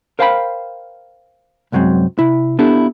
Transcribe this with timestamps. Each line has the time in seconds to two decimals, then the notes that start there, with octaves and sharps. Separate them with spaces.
0.19 A#4 C5 F5 G5 A5 B5
1.72 C2 F#2 F#3 G#3 C4
2.19 C3 E4
2.59 B3 D4 E4 G4 A4